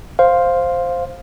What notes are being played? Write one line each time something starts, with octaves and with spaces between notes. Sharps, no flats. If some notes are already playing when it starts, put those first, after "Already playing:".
C5 F5